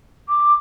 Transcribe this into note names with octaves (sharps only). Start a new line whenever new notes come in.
D6